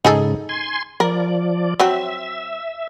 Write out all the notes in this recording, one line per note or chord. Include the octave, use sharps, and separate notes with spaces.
G#2 C#3 D#4 G#4 A4
G#5 C6
F3 A#4 D5
F#3 C4 E5